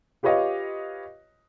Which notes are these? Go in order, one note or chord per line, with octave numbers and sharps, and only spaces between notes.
F4 G4 B4 C#5 D#5 F5